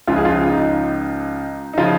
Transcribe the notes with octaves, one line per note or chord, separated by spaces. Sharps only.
C#2 C#3 F3 F4
G#4
F4
D#4
D#4
C#3 F3 F4